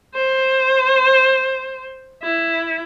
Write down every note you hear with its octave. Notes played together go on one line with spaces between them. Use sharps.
C5
E4